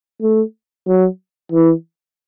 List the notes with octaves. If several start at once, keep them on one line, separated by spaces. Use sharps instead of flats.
A3
F#3
E3